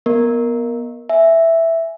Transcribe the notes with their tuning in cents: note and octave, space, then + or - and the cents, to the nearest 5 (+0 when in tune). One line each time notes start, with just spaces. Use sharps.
B3 -20 A#4 +0 D#5 +0
E5 +0 G#5 +0